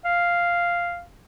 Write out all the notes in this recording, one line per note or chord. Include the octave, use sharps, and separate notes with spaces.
F5